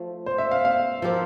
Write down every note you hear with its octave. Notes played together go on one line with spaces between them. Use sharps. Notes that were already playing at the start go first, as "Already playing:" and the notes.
Already playing: F3 A3
C5
E5
F5
F5
F3 C4 G4 A#4